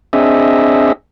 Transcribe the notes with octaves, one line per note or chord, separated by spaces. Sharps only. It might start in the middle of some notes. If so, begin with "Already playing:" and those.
C4 D4 G#4 D#5 E5